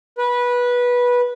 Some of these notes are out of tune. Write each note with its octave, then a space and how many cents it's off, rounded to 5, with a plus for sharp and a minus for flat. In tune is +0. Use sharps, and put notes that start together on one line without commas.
B4 -15